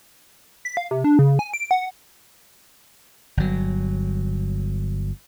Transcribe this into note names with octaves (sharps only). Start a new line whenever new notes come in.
B6
F5
C3
D4
C#3
G#5
D7
F#5
G1 F#3